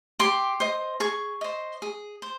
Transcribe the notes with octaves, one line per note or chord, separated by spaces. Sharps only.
G4 C6
C5 D#5
G#4 C#6
C5 D#5
G#4
C5